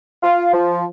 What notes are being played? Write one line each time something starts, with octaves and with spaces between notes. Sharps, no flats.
F4
F3